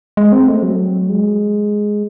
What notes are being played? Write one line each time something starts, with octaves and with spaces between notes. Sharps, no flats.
G#3
C4
A3
F#3
G#3